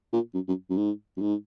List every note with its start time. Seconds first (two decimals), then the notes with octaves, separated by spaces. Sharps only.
0.13 A#2
0.34 F#2
0.48 F#2
0.70 F#2
0.77 G#2
1.17 F#2
1.21 G#2